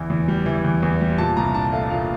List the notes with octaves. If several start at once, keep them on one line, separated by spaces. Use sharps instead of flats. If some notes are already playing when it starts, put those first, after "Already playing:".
Already playing: E2 E3
E2
G3
E3
E2
E2
G3
A#2 A5
C2 A#5
D4 A5
A3 F5
A#2 F5